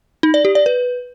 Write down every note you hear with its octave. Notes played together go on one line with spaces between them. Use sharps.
D#4
D5
G4
D5
B4